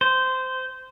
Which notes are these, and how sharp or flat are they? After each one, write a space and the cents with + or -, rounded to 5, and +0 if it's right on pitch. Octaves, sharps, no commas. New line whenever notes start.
C5 -15